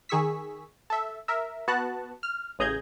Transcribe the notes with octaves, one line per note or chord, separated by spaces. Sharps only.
D#3 G#4 C#6 E6 B6
A4 E5
A#4 E5
B3 F#4 F#5 A5 F#6 A6
F6
A1 C#3 G#4 A#5 G6 G#6